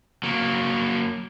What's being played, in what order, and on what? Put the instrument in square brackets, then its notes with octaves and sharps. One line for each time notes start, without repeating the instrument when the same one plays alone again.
[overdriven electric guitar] F#3 A#3